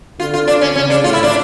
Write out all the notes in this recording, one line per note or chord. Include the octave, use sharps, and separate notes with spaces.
D3 F4
F4
D4
C#4
C#3 C#4
D4
A2 F4
E4
D4